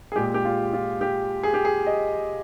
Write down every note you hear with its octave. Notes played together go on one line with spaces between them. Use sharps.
G#4
A#2 G#3 G4
G4
F4
F4
G4
G#4
G4
G#4
D#5